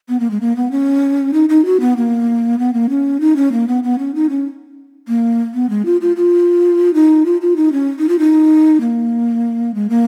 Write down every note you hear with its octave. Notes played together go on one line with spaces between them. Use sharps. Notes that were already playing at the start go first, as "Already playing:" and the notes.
B3
A#3
G#3
A#3
B3
C#4
D#4
D#4
F#4
B3
A#3
B3
A#3
C#4
D#4
C#4
A#3
B3
B3
C#4
D#4
C#4
A#3
B3
G#3
F4
F4
F4
D#4
F4
F4
D#4
C#4
D#4
F4
D#4
A#3
G#3
A#3